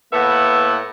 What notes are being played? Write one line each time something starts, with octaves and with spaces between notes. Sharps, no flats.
A2 A#3 B3 E5 F#5